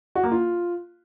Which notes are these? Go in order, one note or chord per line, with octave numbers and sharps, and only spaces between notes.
F#4
A#3
F4